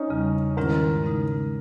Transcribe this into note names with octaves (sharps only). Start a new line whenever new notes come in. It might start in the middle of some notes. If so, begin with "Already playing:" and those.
Already playing: C#4 D#4
E2 C#3 G3
G#2 D#3 G#3 C#4 E4 A#4
C#3 G#3 D#4